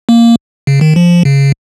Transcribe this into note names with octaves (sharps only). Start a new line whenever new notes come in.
A#3
C#3
D#3
F3
C#3